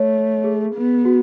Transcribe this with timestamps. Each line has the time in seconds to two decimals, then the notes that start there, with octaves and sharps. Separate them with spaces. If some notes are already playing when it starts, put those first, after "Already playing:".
Already playing: A3 C#5
0.44 G#4
0.75 B3
1.05 F#4